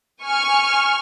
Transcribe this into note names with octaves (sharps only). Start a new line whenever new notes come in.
G#5 C#6 F6